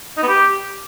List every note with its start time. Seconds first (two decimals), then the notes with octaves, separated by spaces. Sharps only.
0.17 D#4
0.23 B3
0.28 G4